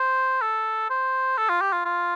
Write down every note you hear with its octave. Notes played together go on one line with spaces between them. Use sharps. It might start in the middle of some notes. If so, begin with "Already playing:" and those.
Already playing: C5
A4
C5
A4
F4
G4
F4
F4